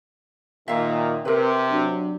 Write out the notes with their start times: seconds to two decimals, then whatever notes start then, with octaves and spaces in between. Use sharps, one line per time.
0.68 A#2 D#3 E5 F5
1.25 C3 A#4 B4
1.70 F#3 D4